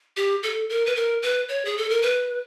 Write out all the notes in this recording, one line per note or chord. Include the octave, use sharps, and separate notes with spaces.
G4
A4
A#4
B4
A#4
B4
C#5
G#4
A4
A#4
B4